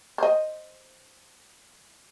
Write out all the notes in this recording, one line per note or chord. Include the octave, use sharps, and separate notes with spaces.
C5 D#5